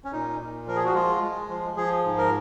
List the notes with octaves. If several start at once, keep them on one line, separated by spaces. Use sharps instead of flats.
C#4
A#2 D#4
A#2
F3 A#4
G#4
F#4
G#3 F4
G#3
F3
F3 G#4
G#2
A#4